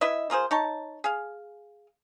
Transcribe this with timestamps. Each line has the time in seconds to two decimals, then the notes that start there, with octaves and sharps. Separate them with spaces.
0.01 E4 B4 D#5 E5
0.30 A#3 F4 G#4 C5
0.51 D#4 C#5 A5
1.04 G#4 F5